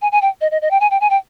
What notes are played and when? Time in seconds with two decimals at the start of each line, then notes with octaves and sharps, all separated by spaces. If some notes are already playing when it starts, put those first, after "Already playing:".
0.02 G#5
0.12 G#5
0.22 G5
0.41 D#5
0.51 D#5
0.62 D#5
0.71 G5
0.80 G#5
0.91 G5
1.01 G#5
1.10 G5